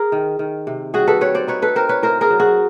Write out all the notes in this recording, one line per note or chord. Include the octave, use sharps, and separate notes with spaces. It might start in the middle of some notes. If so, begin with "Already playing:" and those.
Already playing: G#4 A#4
D#3
D#3
C3
G3 F#4 G#4
A4 B4
C4 B4 C#5
C5 D5
D#4 B4 C#5
A4 B4
C4 A#4 C5
B4 C#5
A2 A#4 C5
G#4 A#4
F#3
F#4 G#4